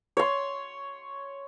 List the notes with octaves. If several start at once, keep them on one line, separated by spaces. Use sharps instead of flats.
C#5 C6